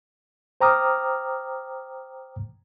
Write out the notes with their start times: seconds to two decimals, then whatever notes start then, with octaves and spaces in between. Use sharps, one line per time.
0.61 C5 G5 A#5 D6 D#6 F6